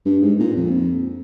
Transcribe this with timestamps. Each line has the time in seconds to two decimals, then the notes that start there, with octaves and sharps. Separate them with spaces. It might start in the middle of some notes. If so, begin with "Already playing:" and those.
0.05 G2
0.22 G#2
0.39 A#2
0.56 F2